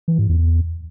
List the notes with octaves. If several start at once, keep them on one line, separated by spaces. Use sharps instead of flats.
E3
G#2
E2